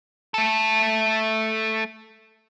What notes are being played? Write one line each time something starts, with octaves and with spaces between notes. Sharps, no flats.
A3 A4